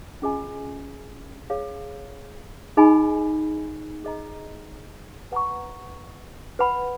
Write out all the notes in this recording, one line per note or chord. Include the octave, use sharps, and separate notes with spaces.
C#4 F4 G#4 D#5 G#5
G#4 C#5 F5
D#4 G#4 D#5 G#5 B5
G#4 D#5 A#5
B4 F#5 A#5 C#6
B4 F#5 B5